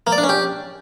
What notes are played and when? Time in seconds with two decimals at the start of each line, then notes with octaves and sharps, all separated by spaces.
0.07 A#3
0.12 D5
0.18 D4
0.24 C#4
0.29 G4